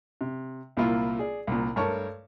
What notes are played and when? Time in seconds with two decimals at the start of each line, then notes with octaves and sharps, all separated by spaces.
0.21 C3
0.77 C2 A#2 A#3 E4 F4 E5
1.19 G#4 D5
1.47 C2 A#2
1.76 G2 A3 A#4 C#5 A5 C#6